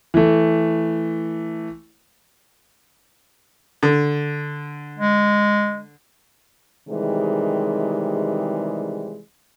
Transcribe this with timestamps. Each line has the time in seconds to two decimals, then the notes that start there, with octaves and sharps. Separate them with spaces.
0.14 E3 A3
3.83 D3
4.98 G#3
6.89 C3 D#3 E3 G3 G#3